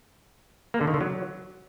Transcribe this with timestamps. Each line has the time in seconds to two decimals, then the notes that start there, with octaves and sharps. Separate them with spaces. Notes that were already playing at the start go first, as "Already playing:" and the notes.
0.74 A#3
0.81 D3
0.87 D#3
0.94 D3
1.01 F#3